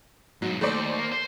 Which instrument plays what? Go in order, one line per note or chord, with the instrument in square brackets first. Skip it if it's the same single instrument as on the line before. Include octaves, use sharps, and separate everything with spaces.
[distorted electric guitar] G#2 B2 [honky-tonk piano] F#3
[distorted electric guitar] D#2 [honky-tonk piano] A3 C5 D5
[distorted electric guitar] A#3
C5